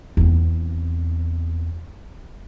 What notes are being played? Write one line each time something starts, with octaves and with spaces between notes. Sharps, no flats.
E2 C4